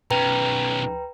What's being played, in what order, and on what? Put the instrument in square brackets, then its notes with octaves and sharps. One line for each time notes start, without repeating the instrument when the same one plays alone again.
[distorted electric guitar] B1 C#4 [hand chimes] B4 G5 A#5